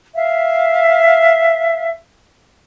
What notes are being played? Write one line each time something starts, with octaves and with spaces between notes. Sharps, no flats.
E5 F5